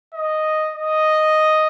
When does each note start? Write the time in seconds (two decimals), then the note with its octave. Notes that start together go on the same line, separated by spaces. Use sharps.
0.13 D#5
0.74 D#5